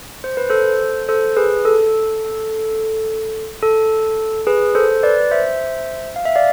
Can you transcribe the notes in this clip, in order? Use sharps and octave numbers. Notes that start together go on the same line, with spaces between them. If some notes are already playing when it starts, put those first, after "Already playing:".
C5
B4
A4 C5
A4 C5
G#4 B4
A4
A4
G#4 B4
A4 C5
B4 D5
C5 E5
F5
E5
D5 F5